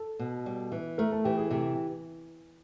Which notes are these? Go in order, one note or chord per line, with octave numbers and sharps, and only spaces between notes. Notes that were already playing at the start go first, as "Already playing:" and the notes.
Already playing: A4
B2
G3
E3
A3 A#4
A4
E3 G4
G#4
C3 G4